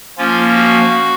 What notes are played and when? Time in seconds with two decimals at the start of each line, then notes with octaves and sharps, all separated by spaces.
0.18 F3 A#3 C#4 F4
0.55 F#4